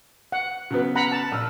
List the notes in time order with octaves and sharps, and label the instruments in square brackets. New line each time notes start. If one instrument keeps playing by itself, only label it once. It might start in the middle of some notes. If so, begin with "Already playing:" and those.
[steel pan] F#5
[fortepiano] C#3 F#3 B3
[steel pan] F#5 A#5 B5
A5
[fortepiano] A#1 E6 F6